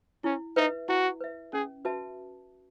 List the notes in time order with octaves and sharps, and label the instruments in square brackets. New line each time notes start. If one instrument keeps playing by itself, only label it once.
[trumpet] C#4 [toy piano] E4
[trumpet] D#4 [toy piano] B4 E5
[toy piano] E4 [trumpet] F#4
[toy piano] B4 E5
[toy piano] C#4 [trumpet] G#4
[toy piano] F#4 B4 E5 A5